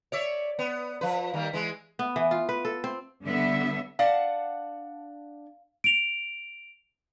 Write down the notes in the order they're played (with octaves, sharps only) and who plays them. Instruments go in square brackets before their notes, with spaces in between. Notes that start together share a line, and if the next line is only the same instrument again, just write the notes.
[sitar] C#5 D5 E5
B3
F3 B4
D#3 G3 A#3
E3 G#3
[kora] B3
E3
F4
B4
A4
C4
[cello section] D3 G3 B3 D4 E5
[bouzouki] D4 F#5 A5 [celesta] F5
[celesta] D7 F7